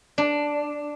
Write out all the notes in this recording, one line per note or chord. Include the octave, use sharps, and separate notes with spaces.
D4